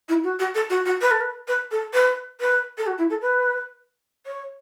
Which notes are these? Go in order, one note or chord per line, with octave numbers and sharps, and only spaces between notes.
E4
F#4
F#4
A4
F#4
F#4
B4
A4
B4
B4
A4
B4
B4
A4
F#4
E4
A4
B4
C#5